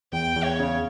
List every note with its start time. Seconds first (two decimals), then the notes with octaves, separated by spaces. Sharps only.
0.13 E2 G5
0.36 E2
0.44 C#5
0.60 C#3